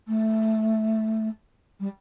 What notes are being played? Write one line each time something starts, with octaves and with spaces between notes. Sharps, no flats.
A3
G3